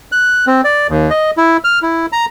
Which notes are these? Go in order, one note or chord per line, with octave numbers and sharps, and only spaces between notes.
F#6
C4
D5
D#2
D#5
E4
F6
E4
A#5